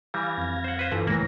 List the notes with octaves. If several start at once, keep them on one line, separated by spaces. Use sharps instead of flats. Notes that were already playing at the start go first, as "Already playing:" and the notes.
E3 G3 F5 G#6 A#6
F2
C5 F#5
B4 C5
G2 E3 F4 A4
C#2 A2 E3 A#3 A#6